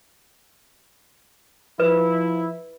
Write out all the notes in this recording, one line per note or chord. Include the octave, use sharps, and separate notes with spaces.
F3 E4 B4